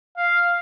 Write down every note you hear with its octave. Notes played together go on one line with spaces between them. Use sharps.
F5